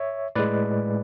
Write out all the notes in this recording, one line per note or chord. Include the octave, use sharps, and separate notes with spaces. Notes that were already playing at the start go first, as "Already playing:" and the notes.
Already playing: C#5 E5
A2 G#3 B4 D5